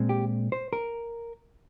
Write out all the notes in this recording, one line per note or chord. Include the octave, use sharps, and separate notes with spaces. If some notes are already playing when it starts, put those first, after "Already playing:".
Already playing: A#2 G#3 C4
G4
C5
A#4